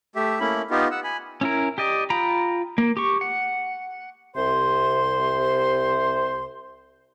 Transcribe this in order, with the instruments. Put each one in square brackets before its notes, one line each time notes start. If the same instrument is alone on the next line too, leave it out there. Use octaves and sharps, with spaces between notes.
[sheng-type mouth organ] A3 G4 E5
A3 A#3 C#4 E4 B5
B3 D#4 F4 G4
F#5 E6
G#5 B5
[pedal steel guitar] C#4 E4 A#4
G4 D5 D#5
F4 G5 A#5 B5
A#3
G4 C#6
F#5
[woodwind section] C2 C3 C5 C6